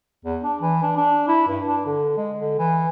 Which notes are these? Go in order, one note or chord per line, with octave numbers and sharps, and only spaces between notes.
E2
D4
E3
D4
D4
E4
G2
D4
D3
G#3
D3
E3